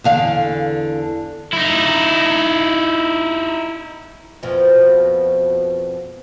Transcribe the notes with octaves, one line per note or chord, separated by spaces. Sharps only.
E2 D3 F5
D#4 E4
F2 B2 F3